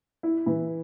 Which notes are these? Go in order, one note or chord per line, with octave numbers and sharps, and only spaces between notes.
E4
E3